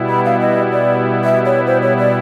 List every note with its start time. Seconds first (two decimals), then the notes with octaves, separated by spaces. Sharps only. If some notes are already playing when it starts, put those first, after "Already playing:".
Already playing: B2 G3 B3 E4
0.09 B5
0.25 F5
0.40 D#5
0.72 D5
1.24 E5
1.46 C#5
1.67 C5
1.82 C#5
1.99 D5